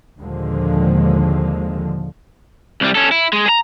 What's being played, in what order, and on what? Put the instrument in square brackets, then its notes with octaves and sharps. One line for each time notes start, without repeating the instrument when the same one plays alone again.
[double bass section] D#2 A#2 D3 F3 G#3
[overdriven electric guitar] C2 G3
C#4 A4
E4
G#3
G#4 A#5